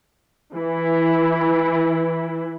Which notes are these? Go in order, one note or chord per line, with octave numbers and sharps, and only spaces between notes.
E3 E4